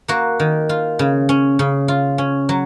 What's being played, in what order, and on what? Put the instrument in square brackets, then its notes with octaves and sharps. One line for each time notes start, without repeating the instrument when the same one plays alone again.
[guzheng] A#3 F#4
D#3
F4
C#3
C#4
C#3
F4
C#4
F#3